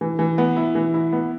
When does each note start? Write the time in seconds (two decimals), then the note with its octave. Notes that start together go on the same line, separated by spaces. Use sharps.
0.01 E3
0.19 E3
0.38 B3
0.56 E4
0.75 E3
0.94 E4
1.13 B3